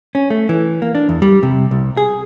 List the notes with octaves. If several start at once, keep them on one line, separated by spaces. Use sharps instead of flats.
C#4
A3
E3
A#3
D4
E2
G3
C3
C2
G#4